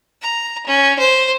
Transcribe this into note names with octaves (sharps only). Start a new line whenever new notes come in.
A#5
C#4
C5